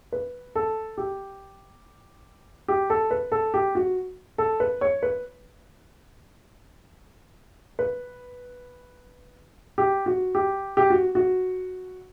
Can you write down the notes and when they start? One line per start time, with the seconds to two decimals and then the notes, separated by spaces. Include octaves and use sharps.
0.12 B4
0.55 A4
0.98 G4
2.68 G4
2.90 A4
3.11 B4
3.32 A4
3.54 G4
3.75 F#4
4.38 A4
4.60 B4
4.81 C#5
5.03 B4
7.79 B4
9.78 G4
10.06 F#4
10.35 G4
10.77 G4
10.90 F#4
11.15 F#4